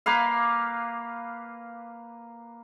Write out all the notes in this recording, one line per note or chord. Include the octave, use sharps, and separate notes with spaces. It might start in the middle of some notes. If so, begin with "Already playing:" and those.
A#3 B4 F5